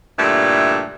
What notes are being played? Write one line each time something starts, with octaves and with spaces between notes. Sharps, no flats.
G2 A#2 D3 E3 A3